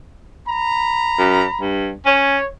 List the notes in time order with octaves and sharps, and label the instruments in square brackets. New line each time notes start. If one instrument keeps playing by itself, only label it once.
[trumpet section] A#5 B5
[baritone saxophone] F#2
G2
[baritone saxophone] C#4 [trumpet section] C#5